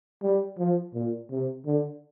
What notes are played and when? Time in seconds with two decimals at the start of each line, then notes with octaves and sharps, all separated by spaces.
0.22 G3
0.59 F3
0.94 A#2
1.31 C3
1.66 D3